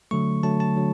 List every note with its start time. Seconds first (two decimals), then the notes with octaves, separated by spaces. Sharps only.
0.11 D3 F#3 A3 C#6
0.43 D3 F#3 A3 A5
0.60 A5
0.76 D3 F#3